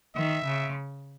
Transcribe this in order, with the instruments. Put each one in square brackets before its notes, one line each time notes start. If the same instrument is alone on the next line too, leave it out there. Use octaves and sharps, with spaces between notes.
[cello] D#3 [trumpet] E5
[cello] C#3